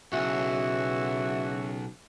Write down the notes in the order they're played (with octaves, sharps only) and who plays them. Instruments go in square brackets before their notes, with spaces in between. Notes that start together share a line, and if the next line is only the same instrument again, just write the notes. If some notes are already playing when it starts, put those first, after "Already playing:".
[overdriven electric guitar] B1 [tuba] C#3 [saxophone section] E3 F#4 [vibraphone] E5